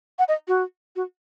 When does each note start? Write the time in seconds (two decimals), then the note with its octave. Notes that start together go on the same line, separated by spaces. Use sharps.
0.19 F#5
0.28 D#5
0.48 F#4
0.96 F#4